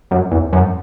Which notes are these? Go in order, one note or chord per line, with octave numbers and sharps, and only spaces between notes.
F#2
E2
F#2